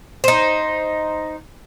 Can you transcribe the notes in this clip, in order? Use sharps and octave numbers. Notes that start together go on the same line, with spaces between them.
D#4 C5